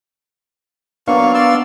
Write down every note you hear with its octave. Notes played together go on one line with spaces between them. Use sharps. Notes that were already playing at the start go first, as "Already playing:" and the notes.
F#3 A#3 B3 D4 F5 C#6
D5 C6 E6